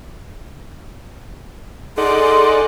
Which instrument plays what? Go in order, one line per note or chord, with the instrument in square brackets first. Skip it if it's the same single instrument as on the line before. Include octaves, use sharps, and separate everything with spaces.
[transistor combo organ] D#4 D5 F#5 [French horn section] G#4 [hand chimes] A4 [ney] C6